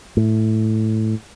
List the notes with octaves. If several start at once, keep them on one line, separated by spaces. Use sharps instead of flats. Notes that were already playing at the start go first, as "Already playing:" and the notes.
A2